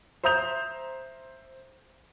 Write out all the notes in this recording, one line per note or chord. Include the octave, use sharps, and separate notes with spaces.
C5 E5 A#5 D#6 G6 F7